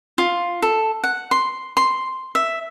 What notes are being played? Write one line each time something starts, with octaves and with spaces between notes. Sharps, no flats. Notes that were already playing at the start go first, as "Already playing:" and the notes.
F4
A4
F#5
C6
C6
E5